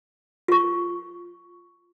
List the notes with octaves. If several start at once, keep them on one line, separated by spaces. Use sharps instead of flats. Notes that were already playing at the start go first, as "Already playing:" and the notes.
F4 C#6